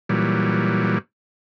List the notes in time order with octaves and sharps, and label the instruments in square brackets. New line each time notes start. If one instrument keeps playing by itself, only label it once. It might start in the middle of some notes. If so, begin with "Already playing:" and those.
[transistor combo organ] A#2 E3 F#3 G3